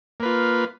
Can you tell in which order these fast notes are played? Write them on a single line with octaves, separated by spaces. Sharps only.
A#3 B4 F4